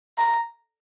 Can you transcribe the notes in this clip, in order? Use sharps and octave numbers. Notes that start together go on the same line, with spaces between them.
A#5